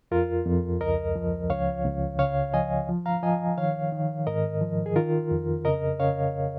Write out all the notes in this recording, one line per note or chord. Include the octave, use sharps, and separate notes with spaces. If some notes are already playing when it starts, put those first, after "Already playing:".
F2 F4 A#4
F2
C#2 A#4 D#5
F3
C#2 C#5 F5
C#2
C#3 C#5 F5
F3 D#5 G#5
F3
F5 A#5
F3 D#5 G#5
D#3 C#5 F5
D#3
G#2 A#4 D#5
F3
G#4
D#3 F4 A#4
F2
C#3 A#4 D#5
C#3 C#5 F5